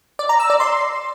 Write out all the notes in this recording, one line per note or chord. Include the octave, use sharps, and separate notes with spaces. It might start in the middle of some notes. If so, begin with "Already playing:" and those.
D5
A#5
E6
D5
C6